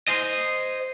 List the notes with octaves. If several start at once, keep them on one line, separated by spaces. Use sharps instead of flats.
C5 D#5